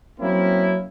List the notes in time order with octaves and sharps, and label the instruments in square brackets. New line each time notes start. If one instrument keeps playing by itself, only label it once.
[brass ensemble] F#3 A#3 C4 C#4 E4